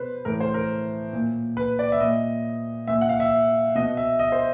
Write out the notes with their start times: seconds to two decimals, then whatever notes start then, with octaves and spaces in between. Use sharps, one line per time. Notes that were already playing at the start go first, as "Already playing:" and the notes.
Already playing: B2 B4 C5
0.25 A2 E3 A#4
0.40 C5
0.54 A#4
1.13 A#2
1.57 B4
1.79 D5
1.92 E5
2.00 A#2 D#5
2.87 A#2 E5
3.01 F#5
3.09 F5
3.20 E5
3.75 B2 D#5
3.97 E5
4.19 D#5
4.32 C5